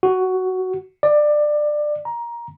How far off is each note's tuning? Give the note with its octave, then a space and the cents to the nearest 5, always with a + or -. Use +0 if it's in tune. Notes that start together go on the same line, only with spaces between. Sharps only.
F#4 +10
D5 +20
A#5 +15